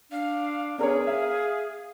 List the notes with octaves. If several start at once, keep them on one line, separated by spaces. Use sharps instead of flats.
D4 F5
B3 D4 G#4 A#4 C#5
E5 F5